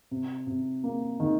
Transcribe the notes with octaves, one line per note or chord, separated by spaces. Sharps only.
C3
C3
A#3
D#3